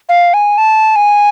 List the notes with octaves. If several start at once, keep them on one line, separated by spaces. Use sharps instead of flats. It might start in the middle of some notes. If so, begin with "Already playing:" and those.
F5
G#5
A5
G#5